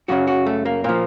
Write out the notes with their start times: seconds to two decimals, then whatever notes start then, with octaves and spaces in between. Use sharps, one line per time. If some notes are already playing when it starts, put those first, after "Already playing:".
0.08 F#2 C#3 F#3 F#4
0.27 F#4
0.46 A3
0.65 A#3
0.84 A#2 F3 A#3